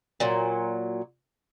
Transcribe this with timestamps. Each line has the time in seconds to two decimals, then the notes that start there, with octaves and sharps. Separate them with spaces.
0.20 A#2 F#3